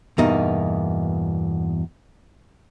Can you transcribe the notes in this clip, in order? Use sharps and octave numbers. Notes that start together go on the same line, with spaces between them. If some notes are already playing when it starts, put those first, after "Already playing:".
E2 G2 B2 A#3 D#4